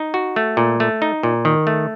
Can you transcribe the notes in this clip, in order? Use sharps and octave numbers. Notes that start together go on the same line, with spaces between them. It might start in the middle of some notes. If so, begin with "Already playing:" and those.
Already playing: D#4
F#4
A3
A#2
A3
D#4
A#2
D#3
A3